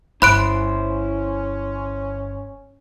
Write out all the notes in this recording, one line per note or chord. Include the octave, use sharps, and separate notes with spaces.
G1 C#4 E4 C5 B5 F#6 D7